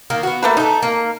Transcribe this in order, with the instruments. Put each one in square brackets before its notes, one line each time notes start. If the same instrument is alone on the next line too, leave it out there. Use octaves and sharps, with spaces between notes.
[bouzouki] D#3 A#3
B3 F#4
[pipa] A3 A#3 B4
[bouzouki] A3 A4 [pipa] D#4
[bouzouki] A#3